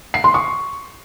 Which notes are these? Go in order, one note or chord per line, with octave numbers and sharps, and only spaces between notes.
C7
C6
C#6